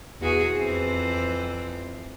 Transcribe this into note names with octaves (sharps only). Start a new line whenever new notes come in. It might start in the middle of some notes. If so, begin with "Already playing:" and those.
E2 F#4 G#4
F2 E3 C4